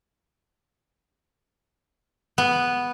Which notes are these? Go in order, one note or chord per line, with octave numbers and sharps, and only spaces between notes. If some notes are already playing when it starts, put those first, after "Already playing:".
B3